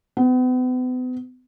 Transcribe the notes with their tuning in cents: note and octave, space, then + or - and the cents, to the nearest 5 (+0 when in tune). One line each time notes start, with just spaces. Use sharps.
B3 +40